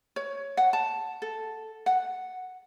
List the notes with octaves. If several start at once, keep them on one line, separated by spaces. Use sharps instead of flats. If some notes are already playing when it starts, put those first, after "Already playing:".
C#5
F#5
A5
A4
F#5